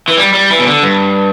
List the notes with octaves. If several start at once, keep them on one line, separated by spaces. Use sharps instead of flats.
E3
G3
G3
E3
B2
D3
G2